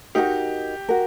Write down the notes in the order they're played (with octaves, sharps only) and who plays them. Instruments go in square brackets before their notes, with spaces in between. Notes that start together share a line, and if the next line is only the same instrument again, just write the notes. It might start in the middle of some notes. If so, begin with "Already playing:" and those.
[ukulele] D#4 F#4 A#4 [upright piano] G4
[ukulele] F#4 A#4